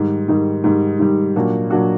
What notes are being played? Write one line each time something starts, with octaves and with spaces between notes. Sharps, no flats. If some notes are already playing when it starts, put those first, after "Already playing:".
Already playing: G#2 D#3 G3
G#2 D#3 G3
G#2 D#3 G3
G#2 D#3 G3
A#2 F#3 A#3 D4 F#4
A#2 F#3 A#3 D4 F#4